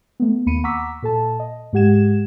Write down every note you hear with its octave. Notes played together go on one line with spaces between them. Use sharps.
A3 B3
D#2 A#3 B5 C#7 D#7
F#5 A#5 C#6 D6 E6 B6
A#2 A4 A5
D#5
G#2 G#3 G4 F#5 G#6 E7